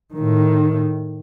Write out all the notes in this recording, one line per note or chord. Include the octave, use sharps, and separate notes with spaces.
A2 D#3